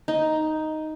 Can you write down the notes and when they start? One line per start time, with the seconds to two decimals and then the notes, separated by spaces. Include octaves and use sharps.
0.08 D#4